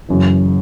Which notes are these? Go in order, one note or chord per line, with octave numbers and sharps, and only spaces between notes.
F#1 F#2 E3